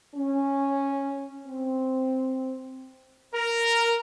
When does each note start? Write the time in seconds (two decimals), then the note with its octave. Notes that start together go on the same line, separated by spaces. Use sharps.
0.16 C#4
1.48 C4
3.34 A#4